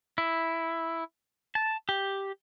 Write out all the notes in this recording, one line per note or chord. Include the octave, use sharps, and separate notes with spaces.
E4
A5
G4